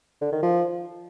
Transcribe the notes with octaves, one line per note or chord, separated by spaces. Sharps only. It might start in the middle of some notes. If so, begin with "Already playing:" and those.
D3
D#3
F3